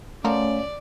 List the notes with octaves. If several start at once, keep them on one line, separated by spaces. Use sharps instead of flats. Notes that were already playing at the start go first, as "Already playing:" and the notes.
F3 A3 C#4 F#4 A#4 D5